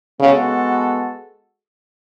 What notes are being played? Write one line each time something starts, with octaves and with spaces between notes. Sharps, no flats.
C#3 G#3 B3 F#4 A4